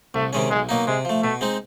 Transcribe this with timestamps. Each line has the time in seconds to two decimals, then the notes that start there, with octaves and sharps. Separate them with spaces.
0.14 C2 A3
0.33 C3 D#3 G#3 C#4
0.50 B1 G#3
0.69 B2 F#3 A#3 D#4
0.87 C3 G#3
1.05 F3 A3
1.23 B2 A3
1.41 G#3 C4 D#4